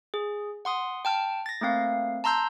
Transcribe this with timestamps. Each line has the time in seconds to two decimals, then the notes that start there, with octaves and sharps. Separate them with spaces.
0.14 G#4
0.65 F#5 C6 D#6
1.05 G5 A5 F6
1.46 A6 A#6
1.61 A3 A#3 C4 F5
2.24 A5 A#5 C6 E6 G6